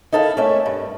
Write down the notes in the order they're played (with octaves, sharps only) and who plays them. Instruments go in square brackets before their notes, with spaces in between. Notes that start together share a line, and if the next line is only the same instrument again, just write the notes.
[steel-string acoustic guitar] D#4 E4 A4 A#4 F5
A3 A#3 C#4 E5
G2